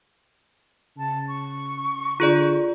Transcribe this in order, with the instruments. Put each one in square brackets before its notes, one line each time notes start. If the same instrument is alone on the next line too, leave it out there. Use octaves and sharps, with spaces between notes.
[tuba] C#3 [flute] A5
[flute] C#6
[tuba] D3 [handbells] F4 G#4 D5